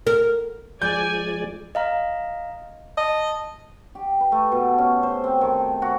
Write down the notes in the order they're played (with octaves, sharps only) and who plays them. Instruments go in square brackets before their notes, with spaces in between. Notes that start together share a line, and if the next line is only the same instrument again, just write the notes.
[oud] A#4
[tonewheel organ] F3 G#3 [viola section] D5 G#5 [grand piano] G6
[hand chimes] D#5 F5 A#5
[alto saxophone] D#5 [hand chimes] A5
[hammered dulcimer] G4
B4
A3
B2
C#4
C5
C4
D#3
F#4